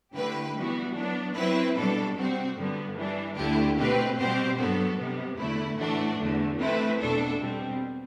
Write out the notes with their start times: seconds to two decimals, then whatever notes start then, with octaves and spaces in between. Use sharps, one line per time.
0.15 D3 A3 E4 G4 B4
0.55 E3 G3 B3 F#4
0.95 F#3 B3 D4
1.36 F#3 C4 E4 B4
1.76 B2 G3 D4 A4
2.16 C3 G3 C4 F#4
2.56 G2 D3 G3 B3
2.97 E3 G3 D4
3.36 D2 D3 A3 E4 G4
3.77 B2 A3 C4 G4 B4
4.17 B2 G3 C4 G4 C5
4.57 G2 F#3 B3 F#4 A4
4.98 C3 G3 B3
5.37 E2 D3 A3 E4
5.78 A2 E3 A3 D4 F#4
6.18 E2 D3 A3
6.58 E3 A3 C4 E4 B4
6.98 E2 B2 A3 D4 A4
7.38 B2 G3 C4